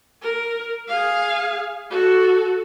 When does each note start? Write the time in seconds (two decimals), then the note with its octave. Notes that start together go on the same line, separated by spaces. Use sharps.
0.22 A#4
0.89 G#4 F5
1.90 F#4 A4